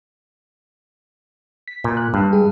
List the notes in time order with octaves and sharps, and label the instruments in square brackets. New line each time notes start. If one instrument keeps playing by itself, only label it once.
[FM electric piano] B6
[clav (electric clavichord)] A#2
[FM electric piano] F#6
[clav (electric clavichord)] G2
[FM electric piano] G#3 G#4